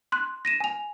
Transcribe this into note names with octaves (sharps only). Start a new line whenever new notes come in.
C6 F#6
A#6 D#7 E7
G#5 F7